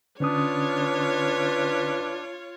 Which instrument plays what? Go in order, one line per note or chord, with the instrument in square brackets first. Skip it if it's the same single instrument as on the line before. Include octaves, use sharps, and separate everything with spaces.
[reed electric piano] D3 C#4 D#6 [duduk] D4 [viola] F4 C#5 [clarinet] B4